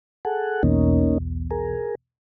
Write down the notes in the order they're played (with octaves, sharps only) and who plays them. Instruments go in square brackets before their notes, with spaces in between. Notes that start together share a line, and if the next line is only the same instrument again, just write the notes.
[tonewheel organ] G#4 A4 F#5
[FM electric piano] B1 E2 B2 [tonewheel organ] A#3 C#4 D#4
[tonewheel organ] G#4 A#4